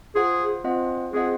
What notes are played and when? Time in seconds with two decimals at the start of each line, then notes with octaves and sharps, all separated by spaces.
0.15 F4 G#4 C5 F#5
0.64 C4 F4 C5 D#5 F#5
1.13 C4 F4 G#4 C5 D#5 F#5